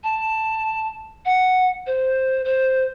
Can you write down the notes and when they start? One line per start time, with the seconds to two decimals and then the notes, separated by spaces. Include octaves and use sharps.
0.03 A5
1.25 F#5
1.86 C5
2.45 C5